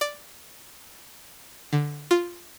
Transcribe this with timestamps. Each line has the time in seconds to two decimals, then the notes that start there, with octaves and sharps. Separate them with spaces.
0.01 D5
1.73 D3
2.11 F4